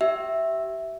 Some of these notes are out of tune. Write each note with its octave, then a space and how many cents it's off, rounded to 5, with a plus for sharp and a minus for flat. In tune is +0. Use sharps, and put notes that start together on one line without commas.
G4 -35 E5 +0